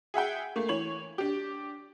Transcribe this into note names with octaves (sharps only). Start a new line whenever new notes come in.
G#4 E5 F#5 G5
A3 A#3
E3 C#5 F#7
D4 G4